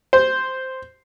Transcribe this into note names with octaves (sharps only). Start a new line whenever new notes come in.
C5